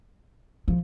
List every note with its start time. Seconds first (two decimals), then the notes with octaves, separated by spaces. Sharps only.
0.68 F3